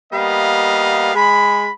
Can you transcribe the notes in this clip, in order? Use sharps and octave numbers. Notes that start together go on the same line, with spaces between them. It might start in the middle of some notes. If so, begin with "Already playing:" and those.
G3 A#3 B3 D#5 F5
G#3 B5